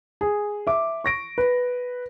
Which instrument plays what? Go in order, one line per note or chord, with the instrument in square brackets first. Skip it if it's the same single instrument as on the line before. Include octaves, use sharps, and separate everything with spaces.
[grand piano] G#4
E5 D6
C#6 A#6 D7
B4